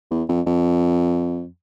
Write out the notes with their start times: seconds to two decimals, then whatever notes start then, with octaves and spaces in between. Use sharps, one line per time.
0.11 E2
0.28 F2
0.46 F2